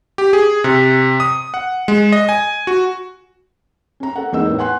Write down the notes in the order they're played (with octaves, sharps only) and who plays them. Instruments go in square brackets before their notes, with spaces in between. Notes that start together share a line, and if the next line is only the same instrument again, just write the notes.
[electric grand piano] G4
G#4
C3
D#6
F#5
G#3
D#5
G#5
F#4
[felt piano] C#4 A#5
A4 F#5
E2 G#3 A#3 D#4 D#5 E6
A2 B3
F#5 G#5 C6 F#6